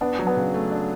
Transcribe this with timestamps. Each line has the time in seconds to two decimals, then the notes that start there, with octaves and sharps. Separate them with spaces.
0.01 B3 D4
0.19 F#3
0.27 B3
0.36 C#3
0.54 A3
0.71 D4